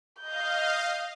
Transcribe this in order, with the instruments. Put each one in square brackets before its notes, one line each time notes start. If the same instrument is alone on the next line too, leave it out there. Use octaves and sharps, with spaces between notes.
[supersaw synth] D#5 F5 [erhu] G6